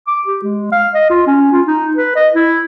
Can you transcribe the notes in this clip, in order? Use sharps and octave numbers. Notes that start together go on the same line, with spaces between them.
D6
G4
G#3
F5
D#5
F4
C#4
F4
D#4
B4
D#5
E4